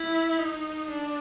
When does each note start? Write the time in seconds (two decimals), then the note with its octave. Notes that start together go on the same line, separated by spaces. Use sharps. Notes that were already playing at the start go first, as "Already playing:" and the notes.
Already playing: E4
0.38 D#4
0.90 D4